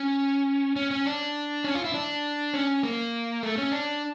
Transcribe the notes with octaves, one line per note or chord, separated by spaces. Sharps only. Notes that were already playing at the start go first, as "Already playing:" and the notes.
Already playing: C#4
C#4
C#4
D4
C#4
F4
E4
D4
C#4
A#3
A3
C#4
D4